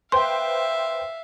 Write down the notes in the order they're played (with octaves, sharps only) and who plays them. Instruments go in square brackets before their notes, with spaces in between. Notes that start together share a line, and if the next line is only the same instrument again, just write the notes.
[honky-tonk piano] B4 C5 G5 [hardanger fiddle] E5 F5 [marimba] C6